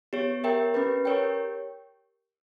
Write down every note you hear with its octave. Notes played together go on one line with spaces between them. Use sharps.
B3 G4 C#5
G4 A#4 E5 G5
C#4 G4 B4
G4 A#4 C#5 G5